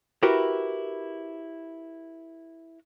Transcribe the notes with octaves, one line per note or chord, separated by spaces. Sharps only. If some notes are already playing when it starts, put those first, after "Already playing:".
E4 F#4 G4 A#4 B4